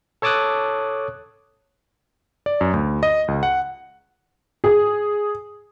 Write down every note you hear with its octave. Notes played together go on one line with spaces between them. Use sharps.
A4 C#5 A5 D6 D#6 F#6
D5
F#2
D2
D#5
C#2
F#5
G#4